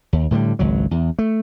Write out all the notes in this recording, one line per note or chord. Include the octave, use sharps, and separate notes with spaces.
D#2
A2 D3 D#3 G3
G#1 C#2 F#3
E2
A3